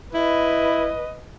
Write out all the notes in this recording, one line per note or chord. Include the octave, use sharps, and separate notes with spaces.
E4 B4 D#5